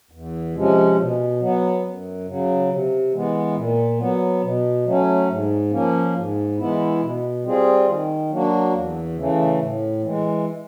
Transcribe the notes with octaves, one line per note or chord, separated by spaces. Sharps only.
E2
C3 F3 G#3 C#4
B2
F#3 B3
F#2
C#3 F#3
C3
E3 G#3 B3
A#2
F#3 B3
B2
F#3 A3 C#4
G#2
F3 A#3 C#4
G#2
E3 G#3 B3 E4
B2
G3 C4 F4 G#4
D#3
F#3 A#3 D4 F#4
E2
C#3 E3 A3
A2
E3 G#3